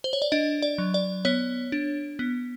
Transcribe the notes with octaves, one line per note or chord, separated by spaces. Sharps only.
C5
C#5
D5
D4 D#5
D5
F#3
D5
B3 C#5
D4
B3